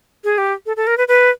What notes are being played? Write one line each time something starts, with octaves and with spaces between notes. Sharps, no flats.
G#4
G4
A4
A4
A#4
B4
B4